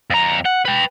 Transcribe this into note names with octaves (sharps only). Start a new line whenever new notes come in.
F2 A#5
F#5
B4 G5